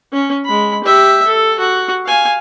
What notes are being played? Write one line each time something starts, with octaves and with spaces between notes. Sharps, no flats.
C#4
G#3 B5
G4 E5
A4
F#4
F5 G#5